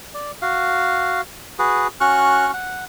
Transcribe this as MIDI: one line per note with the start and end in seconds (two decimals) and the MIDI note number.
0.14 0.31 74
0.42 1.21 66
0.42 1.21 77
1.59 1.87 66
1.59 1.87 68
1.59 1.87 71
2.01 2.51 61
2.01 2.51 66
2.01 2.51 85
2.01 2.51 89
2.01 2.51 90
2.54 2.85 78